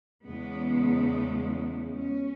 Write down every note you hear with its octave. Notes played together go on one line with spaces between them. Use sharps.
E2 C#3 G#3 B3
C#4